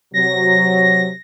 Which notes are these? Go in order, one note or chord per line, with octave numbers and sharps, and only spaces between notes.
C3 F#3 A#6